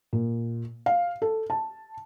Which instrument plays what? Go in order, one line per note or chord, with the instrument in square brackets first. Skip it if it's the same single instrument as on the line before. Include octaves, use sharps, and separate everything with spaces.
[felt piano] A#2
F5
A4
A5